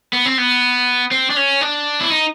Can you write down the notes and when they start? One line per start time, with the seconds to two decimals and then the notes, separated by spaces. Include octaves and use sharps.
0.13 B3
0.26 C4
0.38 B3
1.11 C4
1.30 D4
1.36 C#4
1.61 D4
2.01 E4
2.10 D#4